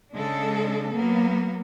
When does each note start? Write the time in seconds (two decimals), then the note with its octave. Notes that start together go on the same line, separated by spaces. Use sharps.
0.14 C#3 G#3 D4 A4
0.93 F#3 A#3 B3